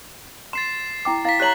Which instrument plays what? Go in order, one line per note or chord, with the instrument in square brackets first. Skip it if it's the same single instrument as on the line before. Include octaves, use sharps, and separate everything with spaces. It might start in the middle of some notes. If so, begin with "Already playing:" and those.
[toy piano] C6 [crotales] A6 C7 E7
[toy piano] E4 G5 D6
[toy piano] E4 F5 [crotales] A6 B6
[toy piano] G4 C#5 A#5 [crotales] F#6 F#7